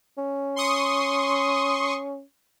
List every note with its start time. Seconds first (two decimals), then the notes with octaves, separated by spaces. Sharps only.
0.18 C#4
0.56 C6 C#6 D#6